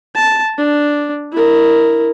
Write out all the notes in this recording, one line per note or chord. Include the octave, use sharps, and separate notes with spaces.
A5
D4
E4 A#4